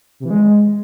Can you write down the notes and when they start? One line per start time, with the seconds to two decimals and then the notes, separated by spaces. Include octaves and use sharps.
0.20 C3
0.25 E3
0.30 G#3